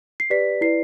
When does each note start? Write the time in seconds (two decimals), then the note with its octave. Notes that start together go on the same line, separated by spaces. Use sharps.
0.20 C7
0.30 G4 B4 D5 B6
0.61 E4 B4 D5 C7